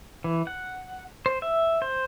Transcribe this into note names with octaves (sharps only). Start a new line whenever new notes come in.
E3
F#5
C5
E5
C5